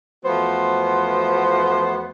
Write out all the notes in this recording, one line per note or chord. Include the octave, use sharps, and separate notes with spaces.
E2 F3 A3 B3 F#4 C5